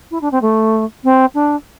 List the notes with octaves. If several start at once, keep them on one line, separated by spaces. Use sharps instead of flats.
E4
D4
C4
A3
C4
D4